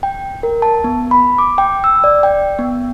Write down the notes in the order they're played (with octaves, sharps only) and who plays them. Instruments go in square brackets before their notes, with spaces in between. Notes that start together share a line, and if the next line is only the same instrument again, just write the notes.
[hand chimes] G5
A#4
A5
B3
B5
D6
G5
E6
D5
G5
B3